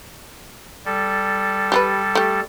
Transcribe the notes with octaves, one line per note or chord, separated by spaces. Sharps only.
G3 A4
G4 G#4 B4
A3 G4